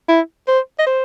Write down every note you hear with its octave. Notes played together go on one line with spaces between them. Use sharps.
E4
C5
D#5
C5